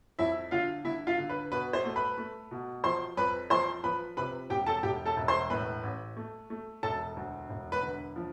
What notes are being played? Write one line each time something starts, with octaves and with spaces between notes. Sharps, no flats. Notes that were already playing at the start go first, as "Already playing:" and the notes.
F2 E4 E5
D3 F4 F5
D3 E4 E5
F4 F5
D3
B4
B2 B4
C5
A3
B4 B5
A3
B2
F3 C5 C6
F2 B4 B5
F3 C5 C6
F3 B4 B5
C3 B4 B5
E1 G4 G5
A4 A5
E1 G4 G5
A4 A5
E1
C5 C6
A2 B4 B5
A1
A3
A3
E1 A4 A5
D2
E1
B4
D3
F3